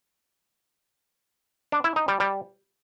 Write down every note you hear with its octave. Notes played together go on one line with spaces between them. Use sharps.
D4
E4
D#4
G3
G3